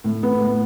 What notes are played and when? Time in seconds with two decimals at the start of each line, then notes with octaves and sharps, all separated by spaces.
0.04 A2
0.23 B3
0.41 A2